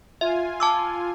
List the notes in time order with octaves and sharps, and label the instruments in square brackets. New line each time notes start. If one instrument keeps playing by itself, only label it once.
[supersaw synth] F4 G#5 [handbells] E5
[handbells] A5 D6 E6